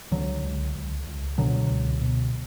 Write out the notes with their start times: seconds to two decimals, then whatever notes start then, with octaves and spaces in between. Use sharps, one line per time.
0.11 C#2 D3 F#3
0.43 C#2
0.75 C#2
1.07 C#2
1.38 B2 D3 F#3
1.70 C#2
2.01 B2